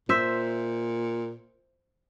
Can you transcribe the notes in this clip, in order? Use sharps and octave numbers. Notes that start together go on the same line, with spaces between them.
A#2 C5 E5